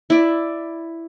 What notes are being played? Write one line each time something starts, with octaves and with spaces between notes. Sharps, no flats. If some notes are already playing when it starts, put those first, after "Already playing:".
E4 D5